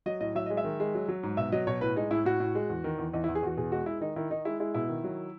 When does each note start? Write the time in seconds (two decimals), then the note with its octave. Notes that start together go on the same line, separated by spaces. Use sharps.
0.06 F#3 D#5
0.21 A2 D#5
0.35 F#3 E5
0.46 G#3 D#5
0.57 E5
0.64 D#3
0.80 G#3
0.95 F#3
1.08 F#3
1.23 G#2
1.37 B2 E5
1.52 F#3 D#5
1.67 B2 C#5
1.81 A2 B4
1.96 G#3 D#4
2.11 A2 E4
2.25 A2 F#4
2.40 A2
2.55 G#3
2.70 E2
2.84 D#3
2.98 E2
3.13 E2 D#4
3.24 E4
3.29 E2
3.35 G#4
3.43 E2 F#4
3.57 B2 G#4
3.72 G#3 F#4
3.86 G#3 E4
4.01 D#3 D#4
4.16 D#3 E4
4.31 D#3 D#4
4.45 G#3 E4
4.60 G#3 E4
4.74 B2 E4
4.89 D#3
5.04 F#3